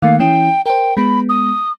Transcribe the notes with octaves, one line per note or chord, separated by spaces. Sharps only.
D#3 A3 A#3 F5
E3 C#4 E4 G5
A#4 C5 G5
G#3 B3 B5
D#6